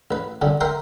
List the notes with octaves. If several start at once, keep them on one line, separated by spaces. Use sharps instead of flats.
A1 B4
C2 F#2 D3 G3
A#4 E5 F#5 G5 C6